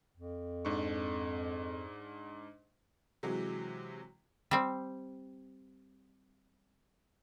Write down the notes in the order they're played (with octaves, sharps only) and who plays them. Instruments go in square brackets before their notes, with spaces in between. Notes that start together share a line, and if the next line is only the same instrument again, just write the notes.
[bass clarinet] F2
[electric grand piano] G#2 D4 C#6
[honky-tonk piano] C3 E3 F#3 G#3
[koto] G3 C4